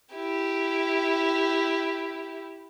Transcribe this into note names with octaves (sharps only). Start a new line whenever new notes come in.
E4 G4